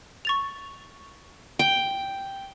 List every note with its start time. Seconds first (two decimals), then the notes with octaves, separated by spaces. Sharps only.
0.25 C#6 A6 F7
1.59 G5 D7